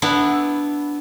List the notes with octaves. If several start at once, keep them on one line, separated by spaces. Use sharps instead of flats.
B3 D4 E4